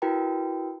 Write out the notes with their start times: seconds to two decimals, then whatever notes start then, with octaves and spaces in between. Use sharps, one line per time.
0.02 E4 F#4 A#4 B4 G5 A#5